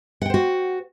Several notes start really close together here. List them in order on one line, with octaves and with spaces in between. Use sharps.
F#5 G5 C5 F#4